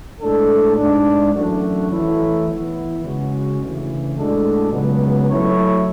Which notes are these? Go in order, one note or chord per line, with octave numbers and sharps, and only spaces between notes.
A2 G#3 D4 A4
G#2 G#3 D4
F#2 E3 A3 D4 F#4
E3 A3 E4 A4 C#5
E3 B3 E4
C#3 G#3 C#4 F#4
D2 C#3 E3
A2 G#3 D4 F#4 A4
C#2 C#3 F#3 B3
F#3 A3 E4 A4 C#5